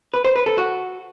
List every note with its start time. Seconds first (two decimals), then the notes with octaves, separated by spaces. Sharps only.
0.14 B4
0.24 C5
0.36 B4
0.46 A4
0.58 F#4